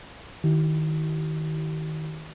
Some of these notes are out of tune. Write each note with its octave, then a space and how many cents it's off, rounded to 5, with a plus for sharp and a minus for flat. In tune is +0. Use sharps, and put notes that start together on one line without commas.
D#3 +0 E4 -5 G4 -40